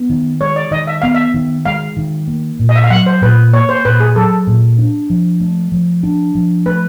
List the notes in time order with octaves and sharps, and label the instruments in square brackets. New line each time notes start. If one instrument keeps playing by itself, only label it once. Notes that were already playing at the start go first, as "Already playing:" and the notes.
Already playing: [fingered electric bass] B3
D#3
[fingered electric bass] G#3 [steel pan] C#5
[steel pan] D5
[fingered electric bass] D#3 [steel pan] D#5
[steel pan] E5
[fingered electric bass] B3 [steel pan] F5
[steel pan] E5
[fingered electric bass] D#3
[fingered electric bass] G#3 [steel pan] F5
[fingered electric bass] D#3
A#3
A#2
[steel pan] D#5
E5
F5
[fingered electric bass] F#3 [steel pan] F#5
[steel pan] C5
[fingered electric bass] A#2 [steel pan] B4
[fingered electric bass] A#3 [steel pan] C#5
[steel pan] C5
[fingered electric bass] A#2 [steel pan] B4
[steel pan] G#4
[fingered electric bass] F#3 [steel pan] A4
[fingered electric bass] A#2
D4
F3
A3
F3
D4
F3
[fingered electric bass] A3 [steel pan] B4